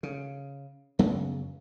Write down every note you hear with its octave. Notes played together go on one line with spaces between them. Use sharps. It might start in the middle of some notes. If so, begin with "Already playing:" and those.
C#3
F#2 C#3 F#3 B3